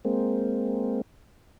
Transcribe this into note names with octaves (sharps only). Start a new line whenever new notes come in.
G#3 A#3 C4